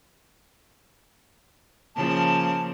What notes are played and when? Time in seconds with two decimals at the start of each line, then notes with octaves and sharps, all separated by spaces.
1.96 C#3 F3 A#3 A5